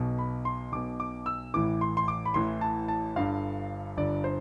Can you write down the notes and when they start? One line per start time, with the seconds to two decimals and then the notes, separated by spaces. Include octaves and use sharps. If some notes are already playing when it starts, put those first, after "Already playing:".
Already playing: B1 B2
0.19 B5
0.45 C6
0.72 B1 B2 D6
1.00 D6
1.26 E6
1.54 A1 A2 E3 D6
1.81 C6
1.97 C6
2.08 D6
2.25 B5
2.34 A1 A2 E3 C6
2.61 A5
2.88 A5
3.15 G1 G2 D3 F5
3.97 G1 G2 D3 D5
4.24 C5